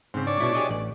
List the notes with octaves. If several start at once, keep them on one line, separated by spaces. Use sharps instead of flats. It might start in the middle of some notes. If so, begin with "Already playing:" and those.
G#2 C#3 C4
D4 C#5 D5
B2 E4
G4 G#4 D#5
A1 D5